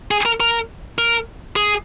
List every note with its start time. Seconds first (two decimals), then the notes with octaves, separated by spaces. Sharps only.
0.11 G#4
0.26 A#4
0.40 A#4
0.98 A#4
1.56 G#4